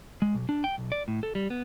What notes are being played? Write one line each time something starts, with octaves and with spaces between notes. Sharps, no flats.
G#3
B1
D4
G5
B1
D5
A2
A4
G3
B3